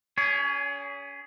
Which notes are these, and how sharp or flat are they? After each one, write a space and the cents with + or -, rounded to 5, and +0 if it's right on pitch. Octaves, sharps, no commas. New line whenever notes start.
C#4 +30 G#4 -5 C#5 +35